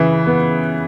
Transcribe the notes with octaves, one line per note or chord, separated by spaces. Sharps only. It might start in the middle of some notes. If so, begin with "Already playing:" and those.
Already playing: C#3 E3
B3